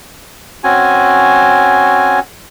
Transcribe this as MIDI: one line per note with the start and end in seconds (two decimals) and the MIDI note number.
0.64 2.20 60
0.64 2.20 61
0.64 2.20 66
0.64 2.20 80